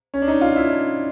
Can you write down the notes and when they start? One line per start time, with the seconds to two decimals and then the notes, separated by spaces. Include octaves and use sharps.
0.14 C#4
0.22 D4
0.28 D#4
0.41 F4
0.56 E4
0.69 D4